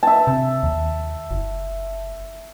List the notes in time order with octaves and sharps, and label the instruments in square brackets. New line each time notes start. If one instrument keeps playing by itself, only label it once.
[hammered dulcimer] E5 A5
[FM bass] C3
D#2
F#1